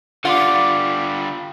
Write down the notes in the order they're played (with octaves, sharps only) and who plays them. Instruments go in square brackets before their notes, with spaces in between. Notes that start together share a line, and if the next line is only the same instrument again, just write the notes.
[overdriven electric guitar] D3 G3 [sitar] F4 [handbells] F#5 D6